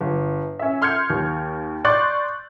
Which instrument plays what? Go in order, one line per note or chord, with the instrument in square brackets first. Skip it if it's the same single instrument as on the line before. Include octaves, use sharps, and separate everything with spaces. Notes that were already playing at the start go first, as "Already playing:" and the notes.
[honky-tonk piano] G1
C#4 E5
C6 F6 G6 G#6 C#7
D#2
D5 C6 C#6 F#6 G6 A6